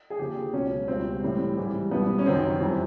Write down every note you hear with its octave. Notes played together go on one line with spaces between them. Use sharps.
G#4
D#2 D3 F3 G4
C#2 B2 F#3 C#4
C#2 B2 G3 C4
A2 E3 G3
G#2 E3 G3
C2 B2 G3 B3
C#4
F#2 D#3 F#3 C4
F2 C3 E3 G3